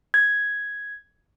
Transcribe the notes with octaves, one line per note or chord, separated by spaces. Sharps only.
G#6